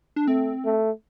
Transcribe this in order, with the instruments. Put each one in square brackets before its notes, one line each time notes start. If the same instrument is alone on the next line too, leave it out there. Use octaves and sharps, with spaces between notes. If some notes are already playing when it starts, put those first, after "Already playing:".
[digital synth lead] D4
[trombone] A3 [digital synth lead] C4
[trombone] A3